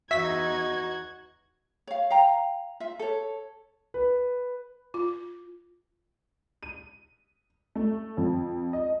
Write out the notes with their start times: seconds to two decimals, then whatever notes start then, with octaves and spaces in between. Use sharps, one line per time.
0.11 E2 D#4 F#4 E5 G#6 B6
1.87 C#5 F5
2.10 F5 G5 A#5
2.80 F4 E5
2.99 A4 C#5
3.94 B4
4.94 F4
6.63 D#7
7.75 A3
8.17 F2
8.73 D#5